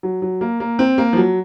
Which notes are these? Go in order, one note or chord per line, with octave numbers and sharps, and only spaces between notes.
F#3
F#3
A#3
A#3
C4
A#3
F3
F#3